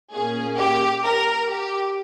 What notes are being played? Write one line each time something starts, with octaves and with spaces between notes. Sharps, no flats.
A#2 A#3 C#4 G#4
G4
A#4
G4